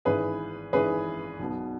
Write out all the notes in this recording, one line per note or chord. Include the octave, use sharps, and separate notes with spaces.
G#1 G#2 E3 G#4 B4
G#1 G#2 E3 G#4 B4
B1 B2